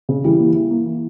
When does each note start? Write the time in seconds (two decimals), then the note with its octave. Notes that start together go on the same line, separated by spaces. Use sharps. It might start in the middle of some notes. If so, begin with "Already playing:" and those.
0.09 C#3
0.24 E3 G3
0.39 A#3
0.55 E3
0.70 A#3
0.86 E3